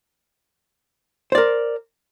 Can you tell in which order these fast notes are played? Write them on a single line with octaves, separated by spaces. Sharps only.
C5 D5 A#4